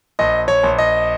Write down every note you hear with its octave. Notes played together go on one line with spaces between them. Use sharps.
A#1 D#5
C#5
A#1
D#5